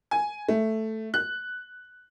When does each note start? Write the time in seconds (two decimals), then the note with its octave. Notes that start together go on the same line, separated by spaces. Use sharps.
0.11 G#5
0.49 A3
1.14 F#6